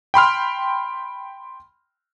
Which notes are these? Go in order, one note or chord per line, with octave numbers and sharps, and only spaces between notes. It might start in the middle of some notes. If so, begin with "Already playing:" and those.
G5 B5 C6 F6